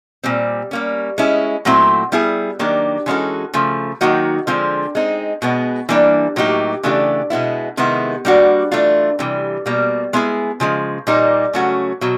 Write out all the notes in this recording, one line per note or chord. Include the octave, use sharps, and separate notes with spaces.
A#2 G3 C4
G3 A#3 C#4
G#3 C#4 E4
A#2 F#3 A3 C4 E4
G3 B3 E4 G#4
D#3 F#3 A#3 D4 G4
E3 G#3 C#4 F#4 A4
C#3 F3 A3
D#3 F#3 A#3 D#4 F#4
D3 F3 G#3 C4 F4
G#3 C4 D#4
B2 G#3 B3
E3 G3 A#3 D4
A2 F#3 A#3 D#4 G4
C#3 E3 A3 D4 G4
B2 G#3 B3 E4
C3 D#3 G#3 B3 E4
G3 A#3 D4 F#4
E3 A3 D4 F4
C3 E3 G3
B2 G3 A#3
G#3 B3 E4 G#4
C#3 F3 G#3
A#2 G3 A#3 D#4
C#3 F#3 A3 C#4 F#4
B2 F#3